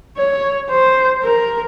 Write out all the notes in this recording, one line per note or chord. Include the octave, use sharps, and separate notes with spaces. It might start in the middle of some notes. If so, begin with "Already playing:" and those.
C#5
C5
A#4